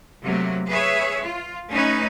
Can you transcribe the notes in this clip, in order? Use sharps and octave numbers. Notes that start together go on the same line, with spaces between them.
C3 F#3 A3 A#3
G#4 B4 C#5 E5
F4
A3 C#4 D#4 B4